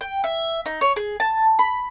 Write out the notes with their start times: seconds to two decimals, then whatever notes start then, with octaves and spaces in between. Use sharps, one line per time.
0.01 G5
0.24 E5
0.66 D#4
0.81 C#5
0.96 G#4
1.20 A5
1.59 B5